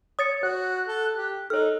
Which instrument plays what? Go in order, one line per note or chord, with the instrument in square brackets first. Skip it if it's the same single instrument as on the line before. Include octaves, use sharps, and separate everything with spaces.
[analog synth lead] C#5 [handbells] D#6 A6 C#7
[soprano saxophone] F#4 [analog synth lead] F#6
[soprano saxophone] A4
G4
[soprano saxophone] D#4 [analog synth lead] A4 [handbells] C#5 F6